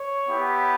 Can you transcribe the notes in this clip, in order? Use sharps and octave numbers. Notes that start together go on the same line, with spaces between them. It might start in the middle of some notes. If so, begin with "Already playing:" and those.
Already playing: C#5
B3 E4 G4